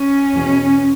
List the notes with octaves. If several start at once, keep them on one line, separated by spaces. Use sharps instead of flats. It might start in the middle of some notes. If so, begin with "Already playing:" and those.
Already playing: C#4
E2 B2